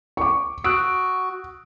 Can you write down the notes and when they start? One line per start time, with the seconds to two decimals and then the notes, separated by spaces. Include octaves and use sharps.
0.17 C#6 D6
0.64 F#4 D#6 E6 F#6 D7